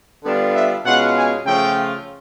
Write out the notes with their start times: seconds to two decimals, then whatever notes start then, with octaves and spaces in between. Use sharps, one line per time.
0.25 D3 G3 B3 D4 F4
0.55 E5
0.85 B2 G#3 C#4 F4 F#5
1.16 G#5
1.46 C#3 F3 A3 C#4 F4 G5